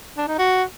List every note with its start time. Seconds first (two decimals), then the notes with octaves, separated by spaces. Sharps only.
0.17 D4
0.28 D#4
0.39 F#4